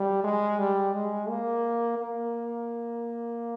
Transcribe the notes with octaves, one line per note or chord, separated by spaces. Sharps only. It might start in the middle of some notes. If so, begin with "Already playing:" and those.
Already playing: G3
G#3
G3
G#3
A#3
A#3